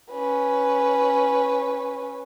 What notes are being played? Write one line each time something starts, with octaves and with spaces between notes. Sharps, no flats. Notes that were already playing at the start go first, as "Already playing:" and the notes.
C#4 B4